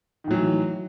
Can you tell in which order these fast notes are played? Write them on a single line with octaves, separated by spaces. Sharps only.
D#3 A2 F#3 E3